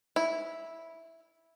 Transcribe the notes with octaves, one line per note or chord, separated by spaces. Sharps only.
E4